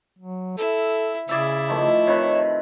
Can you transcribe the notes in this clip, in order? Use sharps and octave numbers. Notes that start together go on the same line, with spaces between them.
F#3
E4 A4
C#3 E4 G#4 D5 E5
D#3 F3 A3
C3 D#3 B4 C#5